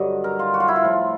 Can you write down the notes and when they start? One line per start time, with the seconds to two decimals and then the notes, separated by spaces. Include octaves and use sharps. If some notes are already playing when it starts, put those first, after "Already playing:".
Already playing: G2 D3 F#3 D#5
0.24 A#4
0.39 F4
0.54 F#4
0.60 F4
0.68 E4
0.76 F4
0.82 A2 F3